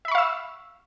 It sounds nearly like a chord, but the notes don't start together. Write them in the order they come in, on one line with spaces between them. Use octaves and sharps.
E5 B5 C#6 F5 E6